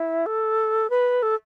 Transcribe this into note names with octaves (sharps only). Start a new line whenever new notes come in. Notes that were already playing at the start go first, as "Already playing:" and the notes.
Already playing: E4
A4
B4
A4